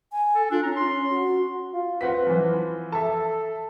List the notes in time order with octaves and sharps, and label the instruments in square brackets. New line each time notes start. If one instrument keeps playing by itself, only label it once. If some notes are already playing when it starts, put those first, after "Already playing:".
[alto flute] G#5
[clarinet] A4
[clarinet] D4 [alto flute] F4
[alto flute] C#4 [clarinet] A#5
[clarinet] C6
[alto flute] F#4
[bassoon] F4
[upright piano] C4 F#5 B6 [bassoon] B4
[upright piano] E3 F3
[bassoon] A4 [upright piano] E5 A5